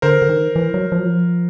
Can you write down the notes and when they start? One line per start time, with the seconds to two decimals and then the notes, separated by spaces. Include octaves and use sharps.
0.02 D3 A#4 C5
0.22 D3
0.29 D#3
0.56 E3
0.74 F#3
0.92 F3
0.99 F#3
1.06 F3